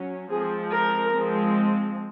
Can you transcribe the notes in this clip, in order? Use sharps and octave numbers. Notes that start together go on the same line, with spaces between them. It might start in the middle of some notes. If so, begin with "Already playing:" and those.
Already playing: F#3 C#4
F3 G#3 C4 G#4
A#4
F3 G#3 C4